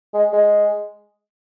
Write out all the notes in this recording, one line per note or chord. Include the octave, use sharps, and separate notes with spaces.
G#3
G#3